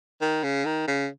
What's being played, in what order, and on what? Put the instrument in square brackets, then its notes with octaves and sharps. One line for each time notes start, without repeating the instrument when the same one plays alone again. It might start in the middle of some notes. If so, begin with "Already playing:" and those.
[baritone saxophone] D#3
C#3
D#3
C#3